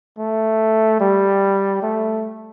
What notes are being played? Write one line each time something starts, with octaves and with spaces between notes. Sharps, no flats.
A3
G3
A3